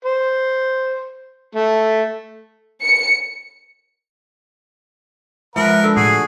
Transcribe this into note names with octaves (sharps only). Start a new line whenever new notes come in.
C5
A3
C#7
F3 G#3 A#4 B4 E5 F#5
D3 E6
A2 F#4 G#4 C7